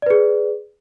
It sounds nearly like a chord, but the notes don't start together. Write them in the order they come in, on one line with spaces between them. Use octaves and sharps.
D5 B4 G#4